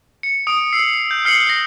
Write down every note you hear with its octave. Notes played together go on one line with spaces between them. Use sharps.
C#7
D#6 D7
E6 C7
G6
F6 C7 C#7 F#7
A#6